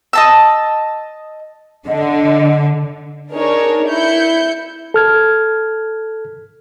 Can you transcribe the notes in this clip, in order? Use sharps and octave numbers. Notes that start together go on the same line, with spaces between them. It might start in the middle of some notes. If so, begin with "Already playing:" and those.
D#5 A5 E6
D3 D#5
D4 D#4 G#4 A#4 C#5
E4 G6 C#7
A4 F6 G#6